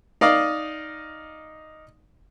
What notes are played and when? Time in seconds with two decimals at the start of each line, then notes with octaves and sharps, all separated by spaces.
0.21 D#4 D5 D#5 F5